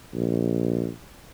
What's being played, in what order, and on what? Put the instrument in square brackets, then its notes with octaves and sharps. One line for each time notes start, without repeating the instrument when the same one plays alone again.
[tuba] A#1